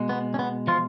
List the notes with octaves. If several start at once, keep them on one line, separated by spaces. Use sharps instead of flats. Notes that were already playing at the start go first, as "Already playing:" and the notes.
Already playing: B2 G#3
B3
C#4
B3
F3 F4